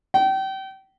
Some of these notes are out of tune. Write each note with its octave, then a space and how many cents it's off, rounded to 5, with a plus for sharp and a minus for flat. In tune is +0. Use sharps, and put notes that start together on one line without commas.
G5 -30